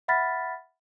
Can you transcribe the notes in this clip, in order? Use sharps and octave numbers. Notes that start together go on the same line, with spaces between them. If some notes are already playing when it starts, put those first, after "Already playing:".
E5 F#5 B5 F6 A6 B6